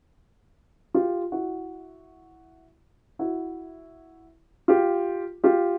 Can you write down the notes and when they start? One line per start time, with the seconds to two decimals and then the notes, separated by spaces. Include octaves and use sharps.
0.94 F4 G4
1.32 E4 F#4
3.19 E4 F#4
4.68 F4 G4
5.44 F4 G4